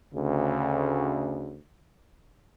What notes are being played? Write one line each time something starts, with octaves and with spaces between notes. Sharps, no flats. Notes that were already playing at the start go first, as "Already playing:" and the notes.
D2 C#3